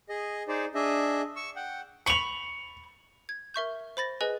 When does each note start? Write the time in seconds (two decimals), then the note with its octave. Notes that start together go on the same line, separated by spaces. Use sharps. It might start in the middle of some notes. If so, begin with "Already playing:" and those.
0.09 G#4 D#5
0.48 D#4 G#4 C5 D5
0.75 D4 G#4 D#5 E5
1.36 C#6 E6
1.56 F#5 G5
2.06 B5 C#6 C#7 F7
3.29 G#6
3.54 A#4 E5 C#6 G6
3.97 C5 B5 A6 A#6
4.21 G#4 B4 D#5 G#5 F#6